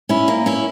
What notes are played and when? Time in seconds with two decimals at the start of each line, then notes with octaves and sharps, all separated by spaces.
0.09 C#4 E4
0.28 A#3
0.46 C#4 E4